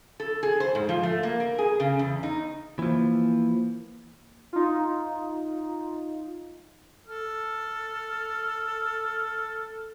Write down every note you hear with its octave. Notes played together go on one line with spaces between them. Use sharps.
A4
G#4
C5
G#2
F3
A3
A#3
A#4
G#4
C#3
E2
D#4
E3 F3 A#3
D#4 F4
A4 F6